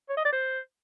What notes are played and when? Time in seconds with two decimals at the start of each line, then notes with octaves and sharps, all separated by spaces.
0.09 C#5
0.17 D#5
0.25 D5
0.32 C5